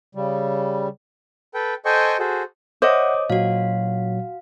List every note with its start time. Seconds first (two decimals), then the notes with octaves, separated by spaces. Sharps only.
0.15 C#3 G3
1.54 A4 B4 G5
1.85 A4 C5 D#5 G5 G#5 C#6
2.19 F#4 G#4 A4 C5
2.82 C5 C#5 D#5 E5 F#5 D6 D#6
3.30 A#2 F#3 F#4 F5